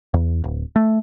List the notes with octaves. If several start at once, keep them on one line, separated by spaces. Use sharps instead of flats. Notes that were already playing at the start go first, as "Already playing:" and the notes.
E2
D1
A3